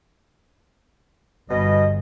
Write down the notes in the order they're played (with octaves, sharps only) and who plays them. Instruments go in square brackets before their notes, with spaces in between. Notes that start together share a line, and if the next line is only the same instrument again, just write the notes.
[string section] G1 [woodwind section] B2 G3 D#5